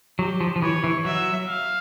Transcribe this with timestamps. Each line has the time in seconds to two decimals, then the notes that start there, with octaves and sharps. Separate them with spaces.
0.19 F#3 G4
0.41 F3
0.56 F3
0.62 E3 C#5
0.84 E3
1.05 F#3 E5
1.48 F5